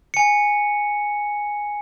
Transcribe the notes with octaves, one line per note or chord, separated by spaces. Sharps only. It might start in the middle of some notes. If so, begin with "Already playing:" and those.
G#5 C#7